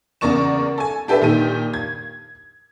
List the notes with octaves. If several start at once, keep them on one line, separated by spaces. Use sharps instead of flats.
E2 C#3 A#4 D5 C#6 E7
A4 G#5
D4 G4 A4 B4 E5
A#2 D#3 G4 D#7
G#6